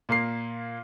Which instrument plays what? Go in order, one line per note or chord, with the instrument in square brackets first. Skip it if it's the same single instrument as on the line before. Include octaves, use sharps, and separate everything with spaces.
[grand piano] A#2 A#3 C7